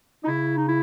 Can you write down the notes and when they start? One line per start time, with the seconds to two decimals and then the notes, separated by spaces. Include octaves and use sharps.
0.24 D#4
0.28 C#3 E4
0.58 D#4
0.68 E4